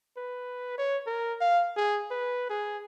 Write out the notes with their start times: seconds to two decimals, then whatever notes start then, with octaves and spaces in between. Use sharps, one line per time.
0.17 B4
0.78 C#5
1.06 A#4
1.41 F5
1.77 G#4
2.11 B4
2.50 G#4